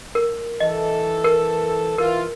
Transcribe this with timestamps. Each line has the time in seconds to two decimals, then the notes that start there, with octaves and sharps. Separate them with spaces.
0.15 A#4
0.60 E3 A4 D#5
1.24 A#4
1.98 E3 F4 A#4